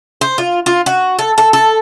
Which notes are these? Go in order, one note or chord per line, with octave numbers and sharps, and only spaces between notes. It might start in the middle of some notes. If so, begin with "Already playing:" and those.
C5
F4
F4
F#4
A4
A4
A4